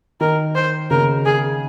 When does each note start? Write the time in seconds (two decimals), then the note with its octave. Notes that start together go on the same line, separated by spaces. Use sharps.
0.21 D#3 A#4
0.55 C5
0.91 C#3 A#4
1.26 G#4